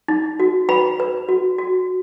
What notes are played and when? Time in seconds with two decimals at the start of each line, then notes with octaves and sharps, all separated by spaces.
0.08 D#4
0.40 F#4
0.69 B4 B5
1.00 B4
1.29 F#4
1.58 F#4